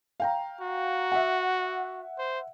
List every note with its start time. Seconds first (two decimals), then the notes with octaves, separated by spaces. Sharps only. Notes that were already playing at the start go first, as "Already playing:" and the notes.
0.20 F5 G5 A#5
0.61 F#4
1.12 E5 F#5
2.19 C5